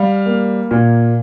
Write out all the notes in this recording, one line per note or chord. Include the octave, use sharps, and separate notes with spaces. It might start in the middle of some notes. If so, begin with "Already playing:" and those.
Already playing: G3 F5
A#3
A#2